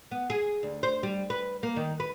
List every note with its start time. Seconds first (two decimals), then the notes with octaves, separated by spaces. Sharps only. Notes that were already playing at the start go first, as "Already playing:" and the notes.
0.11 B3
0.30 G#4
0.63 D2
0.83 C5
1.03 G3
1.30 B4
1.63 A#3
1.76 D#3
2.00 B4